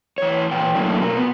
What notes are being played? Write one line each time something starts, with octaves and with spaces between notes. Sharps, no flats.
E3 C#5
A#2 E3 G5
F#3 A3 A#3 D4 E4
B2 A#4
B3